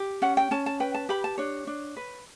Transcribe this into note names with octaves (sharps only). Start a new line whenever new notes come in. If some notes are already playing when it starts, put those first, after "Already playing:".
Already playing: G4
C#4 F#5
G5
C#4 A5
A5
B4 G5
A5
G4 B5
A5
D4 C#5
D4
B4